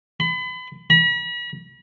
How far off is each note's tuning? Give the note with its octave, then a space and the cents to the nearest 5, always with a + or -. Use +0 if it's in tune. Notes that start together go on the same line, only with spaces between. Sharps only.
B5 +35
B5 -45